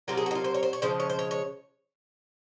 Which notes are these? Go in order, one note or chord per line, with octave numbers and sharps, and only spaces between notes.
C3 F#3 A#3 F4
G#4
F#4
D#4
F4
C5
C#5
C5
C#5
C#3 F3 G#3 C5
C#5
C5
C#5
C#5